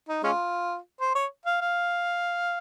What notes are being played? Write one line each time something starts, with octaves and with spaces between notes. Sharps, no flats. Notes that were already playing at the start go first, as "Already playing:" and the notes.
D#4
G#3 C#4 F4
C5
C#5
F5
F5